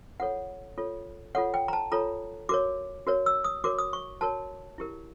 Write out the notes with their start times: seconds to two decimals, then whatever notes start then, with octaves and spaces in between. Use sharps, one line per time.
0.20 F4 A4 C#5 F#5
0.78 F4 A4 C#5
1.35 F4 A4 C#5 F#5
1.54 G5
1.68 A#5
1.73 A5
1.92 F4 A4 C#5 A#5
2.49 F#4 A#4 C#5 D6
3.07 F#4 A#4 C#5
3.26 E6
3.44 D#6
3.64 F#4 A#4 C#5 D6
3.78 D#6
3.93 C#6
4.21 F#4 A#4 C#5 A5
4.78 E4 G4 A#4